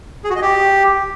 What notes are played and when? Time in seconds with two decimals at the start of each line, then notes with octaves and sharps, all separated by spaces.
0.24 G#4
0.30 F#4
0.36 D#5
0.42 G4